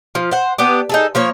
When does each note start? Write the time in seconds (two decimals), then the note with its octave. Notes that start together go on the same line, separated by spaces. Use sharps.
0.15 F3 F4
0.31 C5 F#5
0.58 B3 D4 G4
0.89 D#4 G#4 A4
1.15 F3 A#3 C#5